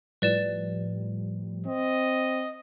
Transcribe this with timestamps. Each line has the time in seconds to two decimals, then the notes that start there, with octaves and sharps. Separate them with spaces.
0.22 A2 F3 G3 B4 D5 E7
1.67 C4 D#5